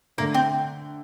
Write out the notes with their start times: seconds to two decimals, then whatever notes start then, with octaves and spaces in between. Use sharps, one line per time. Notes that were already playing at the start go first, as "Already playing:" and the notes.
0.18 D3 A3 A#3 D4
0.34 C4